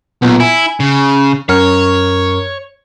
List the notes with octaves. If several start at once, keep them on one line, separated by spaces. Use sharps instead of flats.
B1 A#2 B3
E4 G#5
C#3
F#2 A#4 C#5 F6